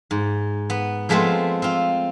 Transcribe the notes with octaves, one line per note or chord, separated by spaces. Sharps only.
G#2
B3
F3 G#3 A3 B3 C4 F4
C4 F4